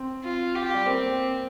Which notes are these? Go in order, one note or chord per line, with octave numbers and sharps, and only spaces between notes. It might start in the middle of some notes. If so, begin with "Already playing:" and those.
Already playing: C4
F4
G4
G3
A#3 C4